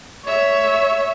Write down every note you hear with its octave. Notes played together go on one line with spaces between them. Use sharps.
C#5 E5